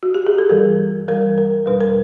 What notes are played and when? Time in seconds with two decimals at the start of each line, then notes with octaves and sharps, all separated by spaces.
0.03 F#4
0.14 G4
0.27 G#4
0.38 A4
0.49 G2 E3 G3 A#4
1.08 G2 E3 G3 A#4
1.38 A#4
1.66 E2 B2 G3 B4
1.81 A#4